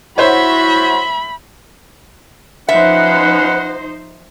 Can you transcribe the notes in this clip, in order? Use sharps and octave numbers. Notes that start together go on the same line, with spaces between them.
E4 F#4 C5 C#5 E5 B5
F3 C#4 D#4 B4 C5 E5 F#5